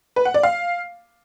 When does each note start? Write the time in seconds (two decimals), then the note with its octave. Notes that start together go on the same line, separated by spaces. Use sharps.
0.16 B4
0.25 F#5
0.34 D5
0.43 F5